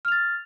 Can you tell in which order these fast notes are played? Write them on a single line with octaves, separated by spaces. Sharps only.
F6 F7 A6